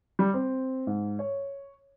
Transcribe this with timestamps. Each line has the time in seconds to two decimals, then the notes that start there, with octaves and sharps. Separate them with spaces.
0.19 G3
0.34 C4
0.87 G#2
1.19 C#5